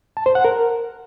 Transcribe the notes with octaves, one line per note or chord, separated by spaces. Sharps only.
A5
C5
F#5
A#4